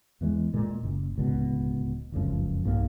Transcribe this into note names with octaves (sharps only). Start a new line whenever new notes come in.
E2 E3 G#3
A#2 G#3
F#1
D1 C#2 B2
F1 C#2 F#2 F3
B1 G2 F#3 A#3